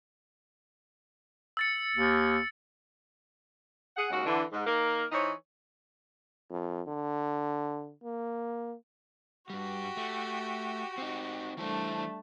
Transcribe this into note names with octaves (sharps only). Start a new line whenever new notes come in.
E6 A6 C#7
D#2
G#4 F#5
D#2 C#3 G#3 F#4
D3 E3
G#2
D#3 A#3 A#4
E3 D#4 C5 C#5
F2
D3
A#3
G2 G3 F#4 G4
A3
C4 D#4
E3 G3 A3 D4 E4 C5